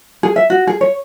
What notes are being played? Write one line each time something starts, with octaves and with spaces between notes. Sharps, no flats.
G#4
E5
F#4
G#4
C#5